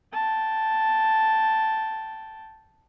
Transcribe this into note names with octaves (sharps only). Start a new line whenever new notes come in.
G5 A5